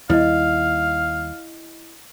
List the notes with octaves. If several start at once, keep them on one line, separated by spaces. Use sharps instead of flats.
D#2 G3 E4 D#5 F5